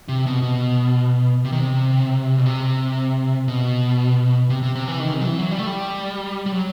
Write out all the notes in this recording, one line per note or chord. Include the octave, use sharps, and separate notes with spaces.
C3
B2
B2
C3
D#3
C3
B2
C3
B2
C3
C3
C3
E3
D#3
C3
F#3
E3
F#3
G3
A3
G3
G3
F#3